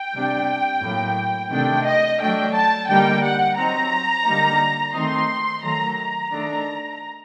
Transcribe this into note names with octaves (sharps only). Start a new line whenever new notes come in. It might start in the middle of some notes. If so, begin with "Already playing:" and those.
Already playing: G5
C3 G3 D4
A2 F#3 A#3
C3 D#3 A3 D4 G5
D#5
F#3 A3 D4 G5
A5
D3 G3 A#3 D#4 G5
F#5
F#3 C4 D#4 A#5
D3 G3 A#3 D#4
D#3 A3 C4 D#4 C6
D#3 F#3 A3 A#5
A#5
D#3 A3 D4